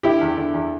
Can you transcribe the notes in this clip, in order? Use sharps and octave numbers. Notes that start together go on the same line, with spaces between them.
D3 E4 G4
E2
D3
E2